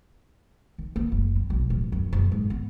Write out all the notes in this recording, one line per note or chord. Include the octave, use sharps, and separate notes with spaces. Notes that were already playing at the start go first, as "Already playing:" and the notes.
D#3
A#3
F#1
C4
B1
D1
F#2
F#1
G#2
B3